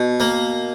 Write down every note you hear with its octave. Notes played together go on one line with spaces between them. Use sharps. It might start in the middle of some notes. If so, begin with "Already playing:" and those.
Already playing: B2
A#3